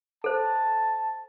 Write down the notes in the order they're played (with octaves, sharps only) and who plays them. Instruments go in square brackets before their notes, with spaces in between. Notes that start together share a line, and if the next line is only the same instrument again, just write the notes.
[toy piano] A4 C5 [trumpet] A5